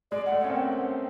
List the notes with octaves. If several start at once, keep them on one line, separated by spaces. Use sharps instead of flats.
G#3 D5
A3 F#5
C#4 F#5
A#3 C4 G5